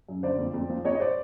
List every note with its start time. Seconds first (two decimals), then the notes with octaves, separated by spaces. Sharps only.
0.08 F#2
0.23 D3 C5 D5
0.39 F2
0.54 F2
0.69 F3
0.85 F2 C#5 D#5
0.95 D#5
1.00 C5 D5